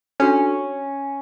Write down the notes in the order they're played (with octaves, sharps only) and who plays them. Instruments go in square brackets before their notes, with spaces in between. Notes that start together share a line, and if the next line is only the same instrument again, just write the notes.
[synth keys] C#4 [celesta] D4 F#4 A4